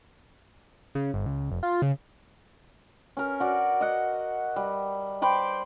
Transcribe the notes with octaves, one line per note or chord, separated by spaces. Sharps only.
C#3
G1
C#2
F1
F4
C#3
C#4 A#4
F#4 D5
D#5 F#5
G3
C5 G5 B5 D6